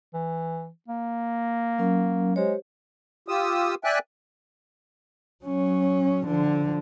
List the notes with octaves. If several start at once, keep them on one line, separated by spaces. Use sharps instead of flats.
E3
A#3
F#3 C#4 A#4
G#3 G4 C5 C#5
F4 G4 D#6 E6
D5 E5 G5 G#5 F#6
F#3 C#4
D3 F3